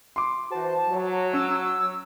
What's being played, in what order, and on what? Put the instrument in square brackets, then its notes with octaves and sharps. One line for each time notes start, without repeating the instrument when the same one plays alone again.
[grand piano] C6 D6
[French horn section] E3 F#4 C5 [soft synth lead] A5
[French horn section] F#3
[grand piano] C#4 [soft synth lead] E6